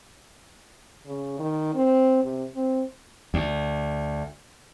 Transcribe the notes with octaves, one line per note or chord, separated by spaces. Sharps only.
C#3
D#3
C4
C3
C4
D2